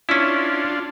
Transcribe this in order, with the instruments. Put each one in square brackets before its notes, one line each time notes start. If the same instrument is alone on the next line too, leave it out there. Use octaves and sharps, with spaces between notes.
[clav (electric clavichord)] C#4 E4 [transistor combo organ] D4 F4